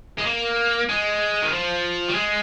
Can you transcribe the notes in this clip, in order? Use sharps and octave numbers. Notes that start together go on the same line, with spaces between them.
G#3
A#3
G#3
D#3
F3
G3
G#3